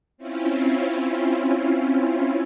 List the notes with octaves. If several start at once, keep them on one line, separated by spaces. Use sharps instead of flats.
C4 C#4 E4 F4